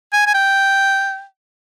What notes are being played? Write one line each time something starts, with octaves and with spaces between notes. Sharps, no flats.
G#5
G#5
G5